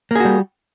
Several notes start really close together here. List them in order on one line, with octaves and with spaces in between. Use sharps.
A#3 G#4 F#4 G3